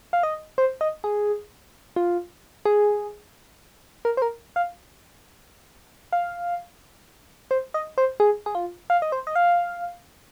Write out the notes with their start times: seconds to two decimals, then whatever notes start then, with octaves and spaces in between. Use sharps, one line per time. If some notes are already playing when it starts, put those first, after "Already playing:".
0.13 F5
0.23 D#5
0.58 C5
0.81 D#5
1.04 G#4
1.96 F4
2.65 G#4
4.05 A#4
4.17 C5
4.22 A#4
4.56 F5
6.13 F5
7.51 C5
7.74 D#5
7.98 C5
8.20 G#4
8.46 G#4
8.55 F4
8.90 F5
9.02 D#5
9.12 C5
9.27 D#5
9.36 F5